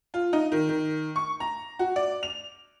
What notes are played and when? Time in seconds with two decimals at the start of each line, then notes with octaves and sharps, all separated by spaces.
0.14 F4
0.33 D#4
0.52 D#3
0.69 D#3
1.16 C#6
1.40 A#5
1.79 F#4
1.96 D5
2.23 F7